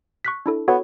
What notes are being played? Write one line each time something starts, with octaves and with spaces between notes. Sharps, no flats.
C#6 F#6 B6
D4 E4 A4
B3 F#4 A4 C#5